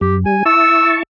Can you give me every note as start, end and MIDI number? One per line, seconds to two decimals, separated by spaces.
0.01 0.25 42
0.01 0.16 67
0.26 0.43 55
0.26 0.43 80
0.45 1.03 64
0.45 1.03 81
0.45 1.03 85
0.45 0.94 88